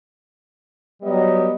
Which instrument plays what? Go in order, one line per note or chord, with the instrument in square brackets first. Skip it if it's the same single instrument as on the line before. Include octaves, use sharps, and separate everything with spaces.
[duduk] F#3 [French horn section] G3 B3 D#5